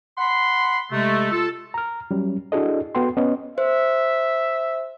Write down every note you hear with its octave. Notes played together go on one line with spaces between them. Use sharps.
F#5 B5 C6
C3 G#3 A3
F4 A4
A#5 F6
F#3 G3 C#4
D4 E4 F#4 G#4 A4 D#5
B3 F#4 A4 G5 C6
B3 C#4 D#5
C5 E5